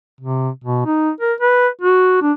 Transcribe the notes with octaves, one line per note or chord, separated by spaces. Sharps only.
C3
B2
D#4
A#4
B4
F#4
D4